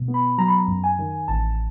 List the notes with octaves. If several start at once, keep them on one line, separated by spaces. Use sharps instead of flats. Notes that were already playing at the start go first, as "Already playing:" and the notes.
Already playing: B2
B3
B5
F#3 A#5
B5
A#5
F#2
G#5
D#3
A1 A5